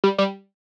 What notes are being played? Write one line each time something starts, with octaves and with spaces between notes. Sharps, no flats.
G3
G3